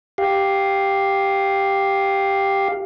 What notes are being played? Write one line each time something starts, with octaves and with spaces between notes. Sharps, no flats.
G4 F5